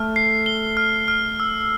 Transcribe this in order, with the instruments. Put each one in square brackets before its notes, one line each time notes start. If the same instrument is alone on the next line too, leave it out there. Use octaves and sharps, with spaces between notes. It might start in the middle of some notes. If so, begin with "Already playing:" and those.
Already playing: [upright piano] A3 A4 [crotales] F6
[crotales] C7
G7
F6
F6
E6